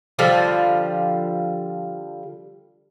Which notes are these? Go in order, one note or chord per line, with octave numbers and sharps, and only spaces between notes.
D3 F3 G3